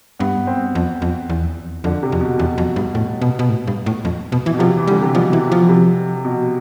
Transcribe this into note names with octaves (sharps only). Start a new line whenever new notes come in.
G2 B3
C4
F2
F2
E2
F2 D3
C3
F2
B2
E2 B2
F2
G2
A2
B2
B2
A2
G2
A2
F2
B2
E3
B2
C3 F3
E3
D3 G3
C3
B2 F3
E3
F3
C3
B2